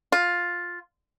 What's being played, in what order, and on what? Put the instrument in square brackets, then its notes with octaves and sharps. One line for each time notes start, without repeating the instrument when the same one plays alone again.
[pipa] F4